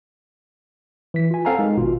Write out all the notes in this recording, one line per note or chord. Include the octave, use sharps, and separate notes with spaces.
E3 B6
F4 G#5
C4 A4 F5 F#5 G#5 A#5
G#3 D#4 A#4
G#1 B2 F4